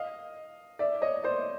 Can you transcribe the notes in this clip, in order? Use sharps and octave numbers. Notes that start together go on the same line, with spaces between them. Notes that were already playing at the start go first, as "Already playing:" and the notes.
Already playing: D#5 F5
D5 E5
C#5 D#5
C5 D5